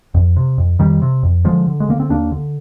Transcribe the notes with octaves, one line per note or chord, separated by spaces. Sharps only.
F2
C3
F2
F2 D#3 G3
C3
F2
D3 F3 G#3
D3
G#3
D3 A#3
C4
D#2 A#3 D4
D3